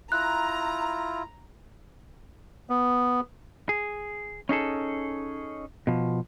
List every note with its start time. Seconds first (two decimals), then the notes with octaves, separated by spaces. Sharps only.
0.12 E4 F4 A#5 F#6
2.70 B3
3.69 G#4
4.49 C#4 D#4 G#4 A4
5.87 B2 F3